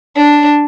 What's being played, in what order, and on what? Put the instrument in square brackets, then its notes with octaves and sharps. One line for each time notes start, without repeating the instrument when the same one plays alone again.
[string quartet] D4